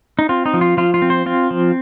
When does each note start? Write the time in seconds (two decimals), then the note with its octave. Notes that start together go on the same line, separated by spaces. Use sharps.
0.19 D#4
0.29 C4 F4
0.46 D#4
0.54 F3
0.61 F4
0.77 F3 F4
0.94 F4
1.02 C4
1.10 C5
1.26 C4 F4
1.51 F3